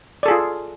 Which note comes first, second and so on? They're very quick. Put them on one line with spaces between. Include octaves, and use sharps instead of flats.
D5 A4 G#4 F4